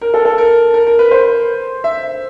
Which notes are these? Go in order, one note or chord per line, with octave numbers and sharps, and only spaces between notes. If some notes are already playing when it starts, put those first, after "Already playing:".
A#4
A4
A4
A#4
A#4
A#4
B4
C5
E5